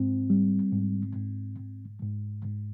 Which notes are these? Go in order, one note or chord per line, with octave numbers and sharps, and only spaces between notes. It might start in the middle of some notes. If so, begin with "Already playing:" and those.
Already playing: G#2 C4
G3
G#2
G#2
G#2
G#2
G#2